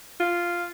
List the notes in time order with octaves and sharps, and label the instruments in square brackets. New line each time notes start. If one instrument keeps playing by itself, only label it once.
[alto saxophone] F4